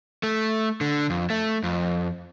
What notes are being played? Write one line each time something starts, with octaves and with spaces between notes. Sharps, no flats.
A3
D3
F2
A3
F2